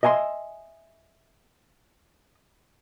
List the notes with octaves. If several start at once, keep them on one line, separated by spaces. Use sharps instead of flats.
D#5 E5 G#5 A#5 C6